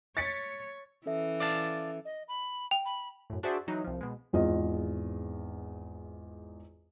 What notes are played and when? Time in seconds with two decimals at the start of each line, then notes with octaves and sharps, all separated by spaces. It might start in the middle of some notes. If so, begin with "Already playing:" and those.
0.17 C#5 A6 B6 C#7
1.06 E3 C#4 A4 E5
1.40 D5 F5 A5
2.05 D#5
2.28 B5
2.71 G5 F7
2.86 B5
3.30 F#2 A2
3.43 D4 F#4 G#4 C5 D5 E5
3.67 E3 F#3 D#4
3.84 C2 F3
4.01 B2 G#3
4.33 G#1 E2 G#2 F4 D#5